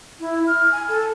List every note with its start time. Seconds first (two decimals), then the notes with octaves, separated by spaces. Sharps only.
0.20 E4
0.47 F6
0.72 G#5
0.89 A4